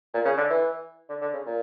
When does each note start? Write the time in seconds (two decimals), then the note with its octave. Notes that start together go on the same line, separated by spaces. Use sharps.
0.14 A#2
0.25 C#3
0.37 D3
0.50 E3
1.09 D3
1.21 D3
1.33 C#3
1.46 A#2